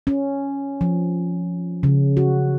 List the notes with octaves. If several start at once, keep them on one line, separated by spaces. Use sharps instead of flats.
C#4
F3
C#3
F#4